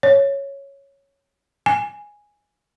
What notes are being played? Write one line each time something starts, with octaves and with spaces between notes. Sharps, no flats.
C#5
G#5